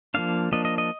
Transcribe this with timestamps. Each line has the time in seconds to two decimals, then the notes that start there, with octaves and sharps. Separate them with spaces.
0.14 F3 A#3 D4 F5
0.52 F3 A#3 D4 D#5
0.65 D#5
0.78 D#5